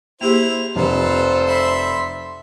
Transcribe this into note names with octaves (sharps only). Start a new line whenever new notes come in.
A#3 E4 G4 G#4 C5 F7
F1 F4 A4 B4 C5
E5 B5 C6